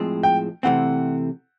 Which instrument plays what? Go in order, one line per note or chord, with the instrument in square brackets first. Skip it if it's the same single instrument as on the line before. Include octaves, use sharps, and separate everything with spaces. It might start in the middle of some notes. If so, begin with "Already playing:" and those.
Already playing: [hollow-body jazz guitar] A2 F3 G#3 C4
[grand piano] G5
[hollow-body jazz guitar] C3 E3 A3 C4 [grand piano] F#5